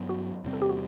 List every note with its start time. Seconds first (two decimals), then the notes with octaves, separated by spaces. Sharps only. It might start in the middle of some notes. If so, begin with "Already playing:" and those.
Already playing: G2 F#3 B3
0.09 F#4
0.44 E2 C3 G3 C4
0.53 A4
0.62 G4
0.69 F#4